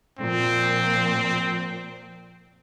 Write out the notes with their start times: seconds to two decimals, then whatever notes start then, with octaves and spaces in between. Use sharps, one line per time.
0.18 A#2 F3 C4